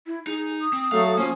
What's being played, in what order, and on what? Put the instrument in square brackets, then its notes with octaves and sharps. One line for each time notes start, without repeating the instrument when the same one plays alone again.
[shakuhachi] E4
[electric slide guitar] D#4 [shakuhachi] G#4
[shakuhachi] D#6
[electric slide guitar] C4
[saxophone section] F#3 A3 [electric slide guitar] F5
[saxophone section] F3 C#4 [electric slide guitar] A#3